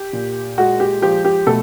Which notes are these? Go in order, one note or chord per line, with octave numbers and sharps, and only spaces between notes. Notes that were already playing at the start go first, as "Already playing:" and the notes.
Already playing: G4
A#2
G#3 F#4
G4
F3 G4
G4
B2 A3 A4